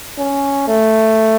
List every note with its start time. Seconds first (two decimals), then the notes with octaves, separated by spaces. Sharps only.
0.18 C#4
0.68 A3